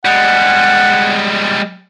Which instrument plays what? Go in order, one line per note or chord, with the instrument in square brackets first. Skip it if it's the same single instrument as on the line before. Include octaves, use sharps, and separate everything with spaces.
[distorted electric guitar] G3 G#3 [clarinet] F#5